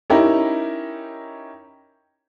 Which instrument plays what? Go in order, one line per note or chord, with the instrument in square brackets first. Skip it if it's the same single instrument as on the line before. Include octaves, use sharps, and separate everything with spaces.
[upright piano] C#4 D#4 E4 G4 A#4